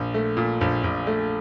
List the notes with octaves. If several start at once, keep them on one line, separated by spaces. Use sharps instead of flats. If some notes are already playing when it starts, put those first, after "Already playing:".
Already playing: A#1
A3
A#2
A#1
A#1
A3